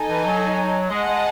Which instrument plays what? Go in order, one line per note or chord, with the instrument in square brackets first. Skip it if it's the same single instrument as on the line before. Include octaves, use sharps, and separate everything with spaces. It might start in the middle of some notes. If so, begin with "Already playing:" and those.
Already playing: [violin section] D#4 A4 D#5 G#5
[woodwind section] E3
F#3
[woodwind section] G#3 [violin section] G#4 D#5 F#5 A5
[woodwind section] G#3